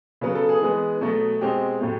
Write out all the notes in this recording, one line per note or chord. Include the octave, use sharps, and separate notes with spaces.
C#3 F#3 B3
A4
G#4
E3 G#3 B3
B2 F#3 A3
B2 G#3 C4 G4
A2 F#3 A3